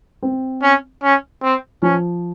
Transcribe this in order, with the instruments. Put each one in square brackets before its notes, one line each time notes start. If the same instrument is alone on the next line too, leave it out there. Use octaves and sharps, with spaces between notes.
[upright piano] C4
[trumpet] C#4
C#4
C4
[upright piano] F3 [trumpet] C#4